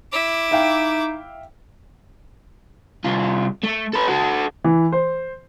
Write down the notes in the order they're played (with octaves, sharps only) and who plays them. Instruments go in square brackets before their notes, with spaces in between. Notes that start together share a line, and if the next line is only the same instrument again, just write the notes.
[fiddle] E4 D6
[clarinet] D#4 [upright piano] E5 F5 G5
[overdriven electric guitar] C2 F4
A3
A4 B4
F#4 A4
[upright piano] E3
C5